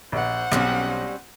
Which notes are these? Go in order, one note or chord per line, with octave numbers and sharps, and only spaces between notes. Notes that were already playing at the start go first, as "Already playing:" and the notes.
A#1 C5 F#5
B1 G3 C4 C#4